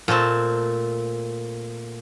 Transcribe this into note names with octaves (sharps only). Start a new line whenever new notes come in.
A#2 A3 C4 A5